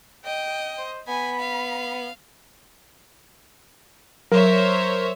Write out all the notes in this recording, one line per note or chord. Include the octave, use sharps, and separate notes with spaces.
D#5 G5
C5
B3 G#5 B5
F5
F#3 A#4 C5 C#5 E5